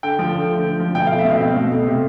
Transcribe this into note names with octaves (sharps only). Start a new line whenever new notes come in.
D3 G5
F3
D3
A3
D3
F3
B2 G5
A3 F5
E5
B2 F5
C4
B2
A3
C3